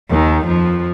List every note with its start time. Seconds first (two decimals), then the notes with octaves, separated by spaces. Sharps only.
0.10 D#2 D#3
0.46 F2 F3